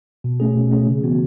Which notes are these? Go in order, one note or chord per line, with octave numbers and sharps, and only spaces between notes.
B2
A3 C#4 G#4
B2
A3 C#4 G#4
C#3
E3 B3 F#4